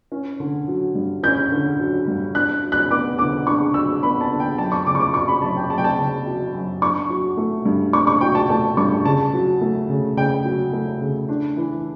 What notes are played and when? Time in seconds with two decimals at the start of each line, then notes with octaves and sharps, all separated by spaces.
0.12 C#4
0.40 D3
0.68 F#3
0.95 G2
1.23 C#4 G6
1.52 D3
1.79 F#3
2.08 G2
2.35 D4 F#6
2.63 F#3
2.72 F#6
2.91 B3 D6
3.18 D3 D6
3.47 D4 C#6
3.74 F#3 E6
4.03 B3 B5
4.21 A5
4.31 D3
4.40 G5
4.58 F#2 A5
4.72 C#6
4.86 C#3 D6
4.95 C#6
5.00 D6
5.14 F#3 C#6
5.28 B5
5.42 F#2 A5
5.56 G5
5.70 F#2 A5
5.78 G5
5.84 A5
5.98 C#3
6.26 F#3
6.53 F#2
6.82 D4 C#6
7.10 F#3
7.37 A3
7.65 G2
7.93 D4 C#6
8.07 C#6
8.21 F#3 G5
8.35 A5
8.49 A3 A5
8.77 G2 C#6
9.05 C#3 A5
9.34 F#3
9.61 A3
9.89 C#3
10.17 C#3 G5
10.44 F#3
10.72 A3
11.00 C#3
11.29 D4
11.57 E3